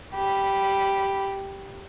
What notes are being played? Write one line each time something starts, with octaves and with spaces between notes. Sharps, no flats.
G4 B5